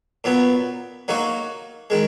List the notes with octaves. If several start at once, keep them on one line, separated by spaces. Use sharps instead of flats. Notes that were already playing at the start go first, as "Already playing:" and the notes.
A#2 F#3 B3
F#3 A#3 D#4 F#4
D#3 G#3